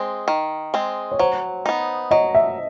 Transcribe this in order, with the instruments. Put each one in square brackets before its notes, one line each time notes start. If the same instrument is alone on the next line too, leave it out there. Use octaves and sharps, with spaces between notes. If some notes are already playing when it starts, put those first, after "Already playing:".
Already playing: [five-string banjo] G#3 C4
D#3
G#3 C4
[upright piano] C#5
[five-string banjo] F#3 [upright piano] C5
[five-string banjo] B3 D#4
[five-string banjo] F#3 [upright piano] D#5
[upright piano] E5